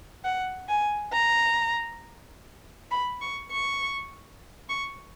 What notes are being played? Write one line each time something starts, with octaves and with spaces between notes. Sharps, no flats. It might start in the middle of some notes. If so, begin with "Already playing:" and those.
F#5
G#5
A#5
B5
C#6
C#6
C#6